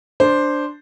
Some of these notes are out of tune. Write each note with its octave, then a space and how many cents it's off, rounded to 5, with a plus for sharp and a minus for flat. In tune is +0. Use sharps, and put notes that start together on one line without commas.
D4 +0 C5 +0